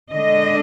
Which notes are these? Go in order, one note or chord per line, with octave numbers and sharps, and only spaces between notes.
D3 G#3 D4 D#5